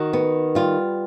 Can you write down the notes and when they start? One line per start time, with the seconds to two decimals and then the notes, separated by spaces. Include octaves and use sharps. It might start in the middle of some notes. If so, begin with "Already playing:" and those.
Already playing: D#3 F#4
0.13 B3
0.55 G3 F4